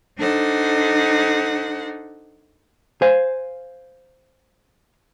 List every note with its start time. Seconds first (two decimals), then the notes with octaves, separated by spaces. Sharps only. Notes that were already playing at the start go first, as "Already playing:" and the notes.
0.18 D4 D#4 A4 C5 F#5
3.02 C5 F5 G#5